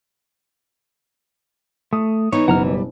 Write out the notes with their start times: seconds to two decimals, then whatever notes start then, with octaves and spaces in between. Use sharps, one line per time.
1.93 A3 D#6
2.32 E3 B3 D#4 C#5
2.48 F#1 B2 F#5 A#5 F6
2.66 G3